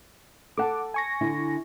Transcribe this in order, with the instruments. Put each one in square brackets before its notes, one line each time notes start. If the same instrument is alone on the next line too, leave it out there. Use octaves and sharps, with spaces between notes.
[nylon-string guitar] A4 A5 [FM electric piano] F#5 D6
[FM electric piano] G#5 C#6 A#6
[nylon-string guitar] D3 E4